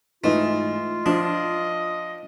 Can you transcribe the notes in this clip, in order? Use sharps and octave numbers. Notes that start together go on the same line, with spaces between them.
G#2 E3 A3 D#4 F4
F3 D4 D#5